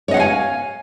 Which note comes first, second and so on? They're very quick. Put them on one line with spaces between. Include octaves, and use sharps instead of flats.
C#5 D#5 F#5 F5 G#5